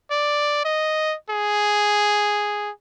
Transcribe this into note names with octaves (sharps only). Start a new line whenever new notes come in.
D5
D#5
G#4